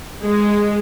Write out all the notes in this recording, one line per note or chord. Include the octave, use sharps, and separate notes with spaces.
G#3